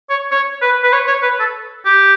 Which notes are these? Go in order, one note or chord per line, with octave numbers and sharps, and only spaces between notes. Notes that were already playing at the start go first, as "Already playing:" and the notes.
C#5
C#5
B4
B4
C#5
C#5
B4
A4
G4